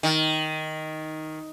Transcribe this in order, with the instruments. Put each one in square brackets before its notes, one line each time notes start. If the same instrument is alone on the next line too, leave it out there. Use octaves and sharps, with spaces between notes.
[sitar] D#3